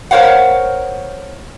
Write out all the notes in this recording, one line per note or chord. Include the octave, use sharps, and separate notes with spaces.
A#4 C5 C#5 F5 F#5